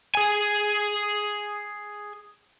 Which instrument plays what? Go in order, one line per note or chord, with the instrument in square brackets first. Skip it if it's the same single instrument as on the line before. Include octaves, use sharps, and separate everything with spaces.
[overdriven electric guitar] G#4 G#5